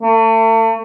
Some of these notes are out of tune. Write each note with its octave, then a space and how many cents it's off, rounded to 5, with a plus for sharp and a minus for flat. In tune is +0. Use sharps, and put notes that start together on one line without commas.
A3 +35